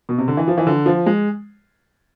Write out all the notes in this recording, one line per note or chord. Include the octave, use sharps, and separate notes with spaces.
B2
C3
D3
E3
F3
E3
D3
F3
G#3